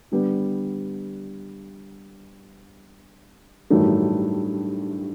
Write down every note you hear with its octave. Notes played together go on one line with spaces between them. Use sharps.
D3 G3 B3
A1 G2 D#3 F#3 A3